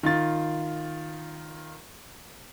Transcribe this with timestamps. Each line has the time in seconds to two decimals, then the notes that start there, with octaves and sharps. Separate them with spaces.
0.03 D#3 F4 A6